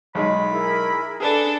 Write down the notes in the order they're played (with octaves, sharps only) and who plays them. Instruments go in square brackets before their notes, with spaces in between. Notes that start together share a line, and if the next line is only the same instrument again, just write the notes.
[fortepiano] B1 G#3 D#4 [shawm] B5
[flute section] E4 G#4 A#4
[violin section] D4 A4 [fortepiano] G#4 B4 D5